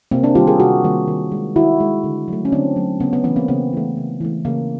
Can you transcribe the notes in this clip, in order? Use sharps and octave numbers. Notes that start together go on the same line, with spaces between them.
C3 A#3 C4
C4 D4
D#3 G3 A#3 F4 G4
G#4 A#4
C3 F#4 G#4
D#3 G3 A#3
D#3
G#3
D#3 E4 F#4
G#3
D3
F#3 A3
C#4
D3 C4 D4
F#3 A3
C#3 B3 C#4
B3
E3 A3 B3 C#4
A#3 C4
C#3 B3
E3 A3
C#3
E3 A3
C#3 A#3